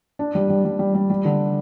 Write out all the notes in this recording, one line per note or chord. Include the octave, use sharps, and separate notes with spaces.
D4
G3
G3
G3
G3
G3
G3
D3